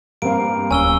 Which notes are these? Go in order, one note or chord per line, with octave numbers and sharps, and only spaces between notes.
G2 A#3 C4 F5 D7
D1 C#4 G#5 E6 G7